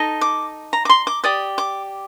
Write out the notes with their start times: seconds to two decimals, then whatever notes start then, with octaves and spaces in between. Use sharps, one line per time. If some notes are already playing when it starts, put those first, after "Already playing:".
Already playing: D#4 A4 D#5
0.21 D6
0.73 A#5
0.85 D6
0.89 C6
1.07 D6
1.24 G4 D5 D#6
1.58 D6